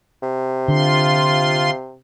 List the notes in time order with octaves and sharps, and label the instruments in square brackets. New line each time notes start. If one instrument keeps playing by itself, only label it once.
[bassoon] C3
[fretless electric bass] D3 [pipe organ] F4 C6